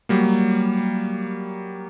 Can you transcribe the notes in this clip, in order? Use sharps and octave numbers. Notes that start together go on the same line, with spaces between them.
F#3 G3 A#3